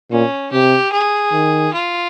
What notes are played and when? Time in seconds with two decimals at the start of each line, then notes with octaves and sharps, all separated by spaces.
0.11 A#2 C#4
0.52 C3 G4
0.92 G#4
1.32 D#3
1.73 F4